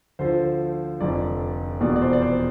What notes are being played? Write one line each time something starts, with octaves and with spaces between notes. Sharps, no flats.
D2 D3 F3 C5
F1 F2 D3 F3 D5
F1 E2 B2 D5
D5
C5
D5
C5